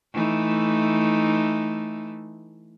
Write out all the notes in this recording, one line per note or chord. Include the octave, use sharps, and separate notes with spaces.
E3 A3 D#4